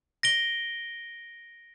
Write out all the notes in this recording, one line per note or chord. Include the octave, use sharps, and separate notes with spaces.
A#6 D7 G7